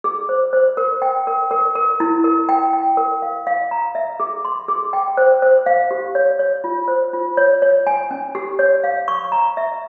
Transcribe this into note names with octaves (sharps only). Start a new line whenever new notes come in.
G#4
C5
C5
A#4
G5
A#4
A#4
A#4
E4
A#4
G5
G5
A#4
F5
F5
A#5
E5
G#4
C6
G#4
G5
C5
C5
F5
G4
C#5
C#5
F4
C5
F4
C#5
C#5
G#5
C#4
G4
C#5
F5
C#6
A#5
E5